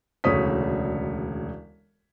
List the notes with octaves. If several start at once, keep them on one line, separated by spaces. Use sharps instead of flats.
E1 D2 C#3 C#5 D#6 B6